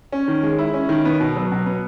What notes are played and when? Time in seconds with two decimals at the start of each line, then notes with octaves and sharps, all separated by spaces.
0.12 C#4
0.28 D#3
0.43 G#3
0.58 E4
0.74 C#4
0.89 D#3
1.05 B3
1.20 B2
1.36 F#3
1.52 B2
1.66 B3